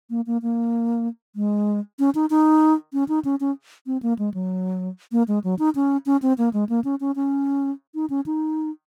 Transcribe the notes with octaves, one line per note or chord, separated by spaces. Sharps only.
A#3
A#3
A#3
G#3
C#4
D#4
D#4
C#4
D#4
C#4
C#4
C4
A#3
G#3
F#3
A#3
G#3
F#3
D#4
C#4
C#4
C4
A#3
G#3
A#3
C#4
C#4
C#4
D#4
C#4
D#4